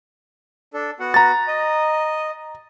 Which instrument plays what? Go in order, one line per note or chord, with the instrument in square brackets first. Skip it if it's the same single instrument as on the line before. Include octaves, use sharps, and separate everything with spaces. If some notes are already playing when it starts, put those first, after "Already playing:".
[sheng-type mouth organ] D4 A4
B3 F#4 F#5
[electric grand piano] A#5 A6
[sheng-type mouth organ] D#5